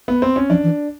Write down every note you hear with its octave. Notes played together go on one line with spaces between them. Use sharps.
B3
C4
C#4
F3 D4
E3